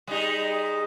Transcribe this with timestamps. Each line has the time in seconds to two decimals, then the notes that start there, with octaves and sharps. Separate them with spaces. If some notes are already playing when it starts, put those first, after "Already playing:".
0.07 G3 G#3 D#4